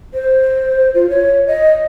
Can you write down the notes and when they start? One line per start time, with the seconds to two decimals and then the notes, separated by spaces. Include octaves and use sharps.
0.14 C5
0.95 F4
1.10 C#5
1.47 D#5